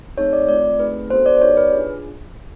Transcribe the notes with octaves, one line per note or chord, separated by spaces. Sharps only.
A3 C4 D#4 G#4 C#5
D5
A3 C4 F4 D5
A3 C4 D#4 G#4 B4
B3 D4 F#4 A4 C5
D5
D5
B3 D#4 G4 C#5
B4
D4 F4 G#4